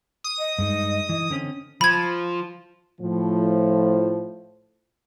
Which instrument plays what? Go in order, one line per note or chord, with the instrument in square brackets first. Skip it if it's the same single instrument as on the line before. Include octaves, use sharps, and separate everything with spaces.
[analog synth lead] D#6
[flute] D#5
[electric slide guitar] G2 G#3 D#4
E3
D3 C4 C#4
[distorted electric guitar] F3 [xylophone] B5 G#6
[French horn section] A2 F3